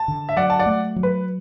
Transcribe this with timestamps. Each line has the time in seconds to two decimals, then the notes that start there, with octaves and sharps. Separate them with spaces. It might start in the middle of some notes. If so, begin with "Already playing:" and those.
Already playing: A5
0.08 D3
0.29 E5
0.37 F#3 D5 F#5
0.50 A5
0.59 D5 F#5
0.66 A3
0.96 F#3
1.03 B4